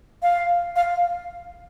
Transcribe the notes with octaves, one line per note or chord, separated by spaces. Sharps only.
F5
F5